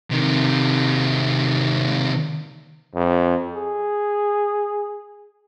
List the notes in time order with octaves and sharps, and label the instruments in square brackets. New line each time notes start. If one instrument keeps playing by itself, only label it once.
[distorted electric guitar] C3 D#3
[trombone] F2
G#4